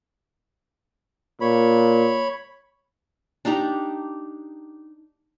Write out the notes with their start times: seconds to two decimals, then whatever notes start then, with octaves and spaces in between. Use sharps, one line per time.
1.41 A#2 C#5 B5
3.45 D4 D#4 G4 A#5